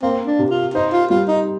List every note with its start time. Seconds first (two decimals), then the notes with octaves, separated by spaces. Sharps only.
0.02 A#3 C4
0.27 D4
0.39 C3
0.50 F4
0.74 D#4 C5
0.92 F4
1.10 G3 F4
1.28 D#4